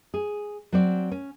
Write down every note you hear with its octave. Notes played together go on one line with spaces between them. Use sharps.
G#4
F#3 C4 D5
C#4